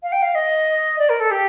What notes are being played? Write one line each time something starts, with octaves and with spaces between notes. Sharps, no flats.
F5
G5
F5
D#5
D5
A#4
A4
G4